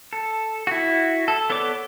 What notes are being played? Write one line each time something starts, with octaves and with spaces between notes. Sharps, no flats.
A4
E4 F#4
A4
B3 A4 C#5 D5 D6